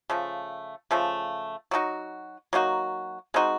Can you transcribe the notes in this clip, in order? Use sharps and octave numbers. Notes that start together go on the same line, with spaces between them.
C#3 F3 A3
C#3 F3 A3
F#3 A#3 D#4 F#4
F#3 A#3 D#4 F#4
G#3 C4 D#4 F#4